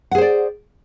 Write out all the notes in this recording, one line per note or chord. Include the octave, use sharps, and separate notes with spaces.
G#4 C5 D5 F#5